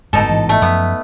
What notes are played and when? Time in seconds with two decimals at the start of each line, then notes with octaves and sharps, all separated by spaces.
0.13 G1 G#2 B2 D#4 A4
0.26 A1 G#2 E3
0.49 A3
0.62 F#2 F3 F#3 B3